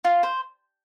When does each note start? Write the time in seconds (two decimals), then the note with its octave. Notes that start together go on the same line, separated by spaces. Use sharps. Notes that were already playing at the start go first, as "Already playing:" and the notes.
0.05 F4
0.23 C5